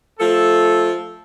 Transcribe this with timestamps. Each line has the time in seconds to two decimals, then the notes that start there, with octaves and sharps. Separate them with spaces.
0.19 F3 A3 A4